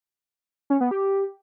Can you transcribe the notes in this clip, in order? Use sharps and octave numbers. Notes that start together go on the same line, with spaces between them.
C#4
B3
G4